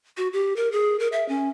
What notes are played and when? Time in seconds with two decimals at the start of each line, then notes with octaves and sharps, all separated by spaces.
0.17 F#4
0.33 G4
0.56 A#4
0.72 G#4
1.00 A#4
1.12 E5
1.28 C#4